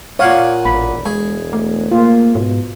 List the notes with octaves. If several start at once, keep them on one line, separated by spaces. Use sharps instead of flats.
A#2 C#5 F5 F#5 D#6
E1 A1 B5
G#3 G#4
A3
A#3 F4
G#2 B2